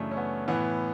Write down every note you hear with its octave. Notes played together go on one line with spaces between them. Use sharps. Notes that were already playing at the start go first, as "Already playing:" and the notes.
Already playing: F#2 C#3 E3 A3 D4 E4
C#4
B3
A2 E3 B3